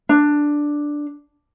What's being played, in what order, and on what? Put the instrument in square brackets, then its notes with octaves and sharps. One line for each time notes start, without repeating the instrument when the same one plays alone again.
[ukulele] D4